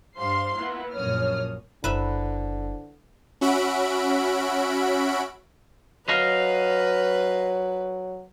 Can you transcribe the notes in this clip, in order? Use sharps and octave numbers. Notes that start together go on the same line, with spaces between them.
G2 G4 C5 F5 C6 C7
A#3 B3 E4
A#1 F#2 A#3 C#5 D#6 F6
F#1 D3 E4 B4 C5 E5
C#4 F#4 E5 B5 D7
F#3 B4 D#5 F5